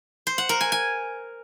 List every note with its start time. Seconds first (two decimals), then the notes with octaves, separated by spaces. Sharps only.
0.27 C5
0.38 F#5
0.49 A#4
0.61 G#5
0.72 G#5